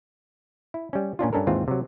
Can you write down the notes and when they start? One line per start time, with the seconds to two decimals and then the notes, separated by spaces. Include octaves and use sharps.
0.74 E4
0.93 G3 C#4
1.19 A#2 C#4 D4 F4
1.33 G2 C#4 D4 A4 A#4
1.47 D#2 G#2 E3 C4 F4
1.68 C3 F#3